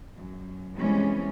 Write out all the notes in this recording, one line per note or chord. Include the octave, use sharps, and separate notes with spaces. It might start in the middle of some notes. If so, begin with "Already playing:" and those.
F#2
C3 E3 G3 G#3 B3 C#4